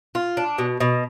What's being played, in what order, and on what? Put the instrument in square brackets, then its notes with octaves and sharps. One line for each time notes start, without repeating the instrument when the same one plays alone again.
[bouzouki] F4
D4
B2
B2